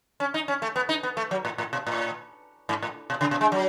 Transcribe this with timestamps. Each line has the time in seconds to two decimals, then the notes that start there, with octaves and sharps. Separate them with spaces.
0.20 C#4
0.34 D#4
0.48 C#4
0.62 A3
0.76 B3
0.89 D#4
1.03 B3
1.17 A3
1.31 F#3
1.45 A2
1.58 A2
1.73 B2
1.87 A2
2.69 G#2
2.82 A2
3.10 B2
3.21 C#3
3.31 B2
3.41 G#3
3.52 F#3